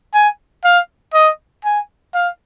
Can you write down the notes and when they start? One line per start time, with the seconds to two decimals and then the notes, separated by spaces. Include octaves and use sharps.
0.13 G#5
0.64 F5
1.14 D#5
1.64 G#5
2.14 F5